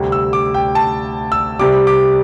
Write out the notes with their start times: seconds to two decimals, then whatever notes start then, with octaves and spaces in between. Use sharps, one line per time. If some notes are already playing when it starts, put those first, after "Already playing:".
Already playing: D2 C3 G3
0.12 E6
0.33 D6
0.54 G5
0.75 A5
1.32 E6
1.59 C2 C3 G3 D6
1.87 D6